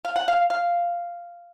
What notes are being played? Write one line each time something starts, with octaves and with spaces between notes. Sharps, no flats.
F5
F#5
F5
F5